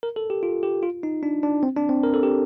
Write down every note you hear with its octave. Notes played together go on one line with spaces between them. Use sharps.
A#4
A4
G4
F4
G4
F4
D#4
D4
D4
C4
D4
C4
A#4
A4
G4